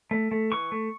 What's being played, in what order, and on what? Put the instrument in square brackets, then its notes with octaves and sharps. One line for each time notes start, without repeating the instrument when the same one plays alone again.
[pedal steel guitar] A3
A3
E3 C#6
A3